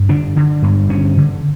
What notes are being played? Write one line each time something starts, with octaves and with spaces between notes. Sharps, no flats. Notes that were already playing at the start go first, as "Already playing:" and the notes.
Already playing: G2
D3 D4
D3
G2
D3 C#4
D3